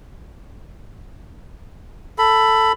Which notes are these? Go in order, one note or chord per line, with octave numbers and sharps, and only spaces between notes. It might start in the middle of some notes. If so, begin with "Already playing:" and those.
A4 B5